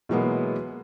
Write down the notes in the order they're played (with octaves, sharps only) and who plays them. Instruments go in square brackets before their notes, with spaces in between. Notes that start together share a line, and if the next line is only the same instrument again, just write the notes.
[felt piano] B2 E3 F#3 G#3 A#3 B3